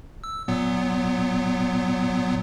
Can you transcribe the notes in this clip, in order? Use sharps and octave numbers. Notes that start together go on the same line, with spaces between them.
E6
A#2 F#3 B3